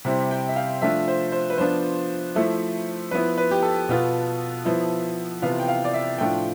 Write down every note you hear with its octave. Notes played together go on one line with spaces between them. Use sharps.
C3 G3 C4 E4
G5
E5
F5
F3 A3 D4 F4 E5
C5
C5
B4
F3 B3 D4 F4 C5
F3 A3 E4
F3 B3 E4 B4
B4
G4
A4
B2 B3 F4
F3 B3 E4
C3 E3 B3 F4 F5
G5
F5
D5
E5
A2 F3 A3 D4 F4 G5